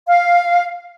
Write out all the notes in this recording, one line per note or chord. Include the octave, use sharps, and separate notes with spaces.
F5